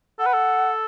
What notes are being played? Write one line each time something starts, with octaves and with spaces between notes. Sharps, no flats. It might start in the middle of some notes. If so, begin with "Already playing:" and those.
A4 F#5
B4
A4